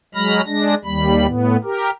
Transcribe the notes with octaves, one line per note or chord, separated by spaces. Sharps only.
F#3 G#3 B5 F6 A#6
G#3 D4 A#6
D#2 G3 B5
A2 B3
G4 A#4